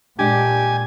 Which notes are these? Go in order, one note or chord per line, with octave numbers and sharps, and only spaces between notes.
A#2 G#3 D4 G4 G#5